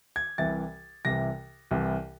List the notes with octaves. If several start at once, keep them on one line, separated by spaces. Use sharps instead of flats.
G#6
C2 C3 E3 A6
C2 C3 E3 A#6
C2 C3 E3